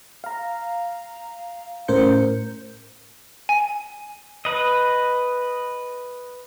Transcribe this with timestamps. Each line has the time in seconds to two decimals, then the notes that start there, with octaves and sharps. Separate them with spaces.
0.24 F5 A#5
1.88 A2 C#4 A#4 C5 G6 C#7
3.49 G#5
4.45 B4 D#5